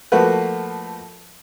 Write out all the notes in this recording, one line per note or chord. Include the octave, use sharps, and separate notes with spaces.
F3 A3 A#3 F#4 B4